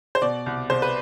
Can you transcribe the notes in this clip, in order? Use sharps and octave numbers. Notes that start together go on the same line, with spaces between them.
C5
B2 D5
C2
C2 C5
B4